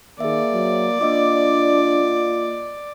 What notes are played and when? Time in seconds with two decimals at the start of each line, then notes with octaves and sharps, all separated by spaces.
0.20 D#3 A#3 G#4 D5 E5
0.53 F#3
1.01 A#3 D4 F4 D#5 D6